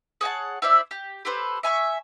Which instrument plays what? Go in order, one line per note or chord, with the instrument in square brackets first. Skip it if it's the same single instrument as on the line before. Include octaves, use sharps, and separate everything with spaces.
[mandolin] G#4 C#5 F#5 A5
E4 C5 D5 E5
G4
G4 A4 B4 C5
E5 G#5 A#5 C#6